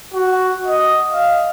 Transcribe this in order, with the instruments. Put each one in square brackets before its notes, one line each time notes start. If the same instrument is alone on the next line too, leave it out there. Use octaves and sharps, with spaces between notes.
[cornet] F#4
D#5
F5